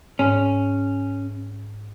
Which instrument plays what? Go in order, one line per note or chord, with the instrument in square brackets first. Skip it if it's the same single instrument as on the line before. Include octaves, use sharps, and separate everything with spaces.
[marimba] G#2 [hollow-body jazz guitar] C#4